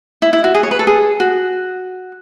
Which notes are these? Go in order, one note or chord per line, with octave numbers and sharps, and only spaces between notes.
E4
E4
F#4
G#4
C#5
B4
A4
G#4
F#4